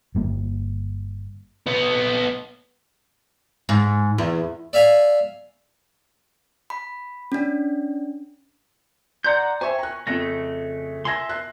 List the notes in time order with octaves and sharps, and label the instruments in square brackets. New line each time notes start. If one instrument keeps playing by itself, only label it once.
[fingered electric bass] G1 G3 A#3
[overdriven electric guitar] B3 D#4
[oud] G#2
E2
[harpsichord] D5 E5 F5 G#5
[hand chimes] B5
C#4 D4
[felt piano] D5 C6 C#7 [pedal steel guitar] F#5 A#5 G6
[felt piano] C5 E5 G5 [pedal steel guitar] G#5 C#6
[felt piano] A#5 F#6
[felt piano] F2 F#6 A#6 [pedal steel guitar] C#3 A3
[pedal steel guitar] E5 C6 [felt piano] G#5 G#6 A#6
[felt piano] F#6 C7